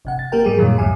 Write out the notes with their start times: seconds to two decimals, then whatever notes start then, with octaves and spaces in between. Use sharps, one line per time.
0.05 G1 C3 F#5
0.19 A6
0.32 A#3 G4 A#4 G5
0.44 G#2 G3 G#4
0.57 F#2 A#2 D#3 F#3
0.78 C#2 F#2 A2 G3 G#5